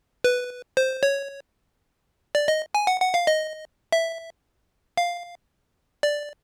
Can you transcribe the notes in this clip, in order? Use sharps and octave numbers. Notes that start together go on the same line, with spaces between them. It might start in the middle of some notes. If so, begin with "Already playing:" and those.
B4
C5
C#5
D5
D#5
G#5
F#5
F#5
F5
D#5
E5
F5
D5